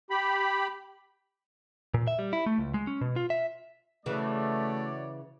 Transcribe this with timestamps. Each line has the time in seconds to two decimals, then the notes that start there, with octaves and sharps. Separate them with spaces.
0.10 G4 B5
1.94 A#2
2.08 E5
2.19 G3
2.33 E4
2.46 A3
2.58 C#2
2.74 G#3
2.87 C#4
3.01 B2
3.16 F4
3.30 E5
4.06 C#3 E3 A3 F#4 C#5 D5